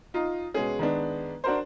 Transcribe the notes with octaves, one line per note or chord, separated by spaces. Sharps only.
D#4 F4
B2 G#3 C#4 G#4
D#3 G#3 B3 D4
D4 F#4 A#4 C5